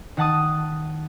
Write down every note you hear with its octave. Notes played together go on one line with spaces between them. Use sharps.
D#3 F#5 A5 D#6